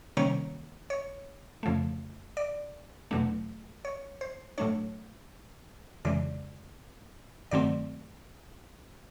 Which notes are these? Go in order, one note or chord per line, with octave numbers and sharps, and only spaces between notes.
C3 D#3 G3 A#3 C#4 C#5
C#5
F2 C#3 F3 A3
D5
E2 B2 F#3 A3 D4
C#5
C5
A2 F#3 A3 D4 C#5
F2 C#3 E3 G#3 D5
G2 D#3 F#3 A3 C4 D5